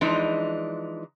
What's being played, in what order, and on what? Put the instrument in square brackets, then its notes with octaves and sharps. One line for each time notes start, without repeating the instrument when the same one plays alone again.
[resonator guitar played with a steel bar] E3 F3 G#3 D4 D#4